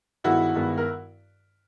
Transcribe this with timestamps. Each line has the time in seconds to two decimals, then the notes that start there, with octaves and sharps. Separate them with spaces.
0.24 G2 D#3 G#3 B3 E4 F#4
0.55 G2 D#3 G#3 B3
0.78 A#4